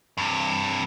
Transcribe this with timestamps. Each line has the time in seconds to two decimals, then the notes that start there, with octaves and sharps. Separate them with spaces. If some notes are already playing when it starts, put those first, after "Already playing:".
0.17 G2 C3